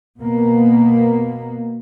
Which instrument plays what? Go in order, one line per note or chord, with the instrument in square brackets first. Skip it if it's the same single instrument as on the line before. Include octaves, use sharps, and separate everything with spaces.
[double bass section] B2 A#3 B3